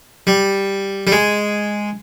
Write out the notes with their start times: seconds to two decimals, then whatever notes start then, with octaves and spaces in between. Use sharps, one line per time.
0.27 G3
1.07 G3
1.12 G#3